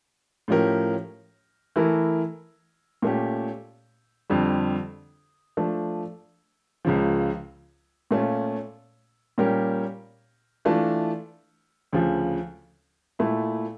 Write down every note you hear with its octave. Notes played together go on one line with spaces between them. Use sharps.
A2 F3 C#4 G4 A#4
E3 A3 E4 A#4
A#2 A3 C#4 G4
F2 D3 G3
F3 A3 D4
C#2 C#3 F3
A#2 A3 C#4 F4
A#2 G3 C#4 G4 A#4
E3 A3 D4 F4
D2 C#3 F3
A#2 A3 E4